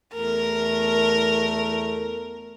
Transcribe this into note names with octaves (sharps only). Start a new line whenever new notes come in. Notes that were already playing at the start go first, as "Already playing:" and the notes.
E2 A3 A#4